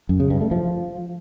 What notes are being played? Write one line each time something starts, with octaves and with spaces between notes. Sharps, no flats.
F#2
C#3
G2
A3
F3